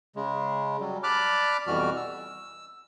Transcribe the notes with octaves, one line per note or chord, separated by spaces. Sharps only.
C#3 G#3
F#3 G3
D5 A5 B5 D6 F6 F#6
F2 B2 E3 G3 F#4 F6
E6